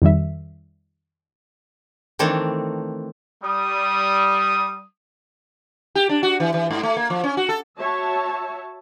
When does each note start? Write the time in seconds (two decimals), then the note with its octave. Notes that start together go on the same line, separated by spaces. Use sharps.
0.02 F2 D#3 G3 E5
2.19 D#3 E3 A3 C4 D4
3.43 G3 D#6
5.95 G4
6.09 D4
6.23 F#4
6.40 E3
6.54 E3
6.71 G#2
6.83 A3
6.97 A#3
7.10 F3
7.24 C#4
7.37 F#4
7.49 A4
7.78 F#4 C#5 E5 A5